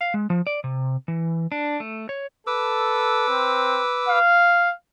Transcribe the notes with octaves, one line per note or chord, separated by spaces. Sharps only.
F5
G#3
F3
D5
C3
E3
D4
A3
C#5
A4 B4 D6 E6
C4
F5